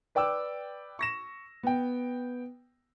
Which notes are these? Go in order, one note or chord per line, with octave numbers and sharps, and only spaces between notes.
B4 D5 G5 D6 E6
C#6 A#6 E7
B3 G5